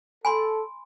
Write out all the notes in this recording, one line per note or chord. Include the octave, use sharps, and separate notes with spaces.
A4 G#5 B5 C6